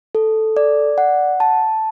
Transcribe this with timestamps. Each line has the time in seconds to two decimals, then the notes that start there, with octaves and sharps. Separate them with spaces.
0.15 A4
0.57 D5
0.98 F#5
1.40 A5